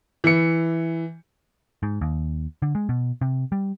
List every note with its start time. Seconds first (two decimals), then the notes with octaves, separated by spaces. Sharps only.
0.24 E3 C#7
1.83 G#2
2.01 D#2
2.62 D3
2.75 G#3
2.89 B2
3.21 C3
3.52 G3